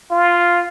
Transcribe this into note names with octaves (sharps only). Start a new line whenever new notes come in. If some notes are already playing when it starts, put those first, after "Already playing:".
F4